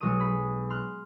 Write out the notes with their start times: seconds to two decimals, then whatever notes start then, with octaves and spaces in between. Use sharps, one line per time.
0.01 B1 F#3 G#3 C#6 D#6 D#7
0.19 G#4 B5
0.70 C6 F6 F#6